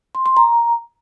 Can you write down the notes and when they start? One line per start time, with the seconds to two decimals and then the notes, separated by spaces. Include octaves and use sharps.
0.15 C6
0.26 C6
0.37 A#5